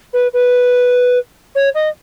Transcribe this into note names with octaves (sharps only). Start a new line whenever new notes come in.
B4
B4
C#5
D#5